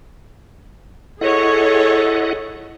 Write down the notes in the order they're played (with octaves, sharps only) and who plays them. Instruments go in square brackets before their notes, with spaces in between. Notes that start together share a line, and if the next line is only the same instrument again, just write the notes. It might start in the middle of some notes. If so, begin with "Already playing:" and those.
[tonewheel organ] E4 D#5 F#5 [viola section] G#4 C#5 [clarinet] A4